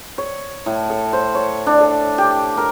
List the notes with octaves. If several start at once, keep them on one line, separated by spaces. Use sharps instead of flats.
C#5
A2
A4
C5
C#5
D4
A4
G4
A#4